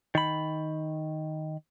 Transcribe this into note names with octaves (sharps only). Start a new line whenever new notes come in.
D#3 B5